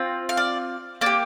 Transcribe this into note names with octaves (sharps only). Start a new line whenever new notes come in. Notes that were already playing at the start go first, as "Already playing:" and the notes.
Already playing: C4 F4
F5
D5
A#3 G4 D5